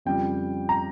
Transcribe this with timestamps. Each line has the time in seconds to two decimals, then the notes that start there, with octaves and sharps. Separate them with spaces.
0.05 F2 C#3 G3 G5
0.69 A#5